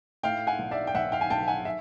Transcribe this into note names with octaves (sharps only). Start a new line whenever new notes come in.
A2 F5 G5
F#5 G#5
B1
D5 E5
G5
B1 E5 F#5
F5 G5
G#5
B1 G5 A5
F#5 G#5
E5